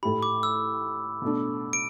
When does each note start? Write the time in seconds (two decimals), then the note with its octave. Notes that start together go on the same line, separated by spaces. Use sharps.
0.03 A2 A3 G4 B5
0.23 D6
0.43 E6
1.22 B2 A3 D4
1.73 D7